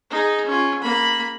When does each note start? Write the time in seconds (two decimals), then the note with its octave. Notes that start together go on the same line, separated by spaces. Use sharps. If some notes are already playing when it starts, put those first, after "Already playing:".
0.10 D#4 G#4
0.46 C#4 F4
0.82 A#3 B5